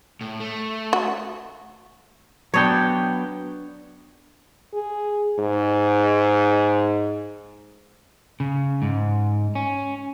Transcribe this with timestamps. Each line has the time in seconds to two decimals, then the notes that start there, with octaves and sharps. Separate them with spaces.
0.21 A2
0.40 A3
0.93 F#4
2.54 F#3 B3 D4 C#5 G5
4.74 G#4
5.39 G#2
8.40 C#3
8.82 G#2
9.55 C#4